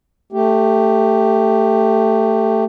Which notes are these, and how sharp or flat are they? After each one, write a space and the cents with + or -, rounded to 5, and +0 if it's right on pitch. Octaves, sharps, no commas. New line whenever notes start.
A3 +15 G4 +0